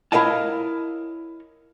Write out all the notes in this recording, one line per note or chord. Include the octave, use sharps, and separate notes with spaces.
E4 A#4 C#5 D#5 F5 A5